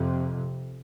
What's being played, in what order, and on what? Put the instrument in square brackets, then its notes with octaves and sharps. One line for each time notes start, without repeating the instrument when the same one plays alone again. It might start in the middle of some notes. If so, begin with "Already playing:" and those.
Already playing: [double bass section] F2 C3